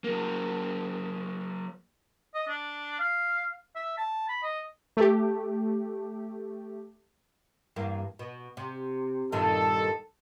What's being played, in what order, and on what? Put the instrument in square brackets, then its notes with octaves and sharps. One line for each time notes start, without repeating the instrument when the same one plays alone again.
[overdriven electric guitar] F#3 A#3
[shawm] D#5
D4
F5
E5
A5
B5
D#5
[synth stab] A3 G4
[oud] E2 G2 A#3
B2
C3
[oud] G2 A#2 D#3 [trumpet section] A4